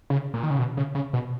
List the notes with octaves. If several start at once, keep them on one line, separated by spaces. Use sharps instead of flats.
C#3
A#2
D#3
C#3
B2
C#3
C#3
B2